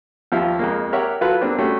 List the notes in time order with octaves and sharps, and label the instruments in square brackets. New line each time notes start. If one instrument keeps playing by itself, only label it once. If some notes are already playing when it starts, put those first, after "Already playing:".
[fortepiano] D#2 F3 G3 E5 F5
F2 G#3 A#3
G4 A#4 C#5 E5 F#5 C#6
F#3 F4 F#4 A4 B4
E2 G3 A#3 C4 D4
G3 A3 C#4 F#4